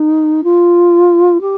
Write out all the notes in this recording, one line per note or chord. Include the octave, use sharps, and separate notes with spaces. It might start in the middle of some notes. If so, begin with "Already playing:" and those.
Already playing: D#4
F4
G4